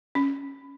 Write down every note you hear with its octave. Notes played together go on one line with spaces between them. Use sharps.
C#4